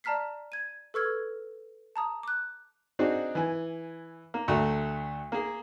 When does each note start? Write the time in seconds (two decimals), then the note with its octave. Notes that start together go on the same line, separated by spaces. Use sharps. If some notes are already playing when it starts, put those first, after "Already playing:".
0.04 D5 A5 A#5 F6 B6 C7
0.52 G#6 D#7
0.94 A4 B4 C#6 E6 F6 G#6
1.96 A5 A#5 D#6
2.23 D6 F#6
2.99 C4 D4 D#4 F#4 G#4
3.35 E3 G#5
4.34 A#3
4.48 D2 A3 F#4 A#5
5.32 A#3 G#4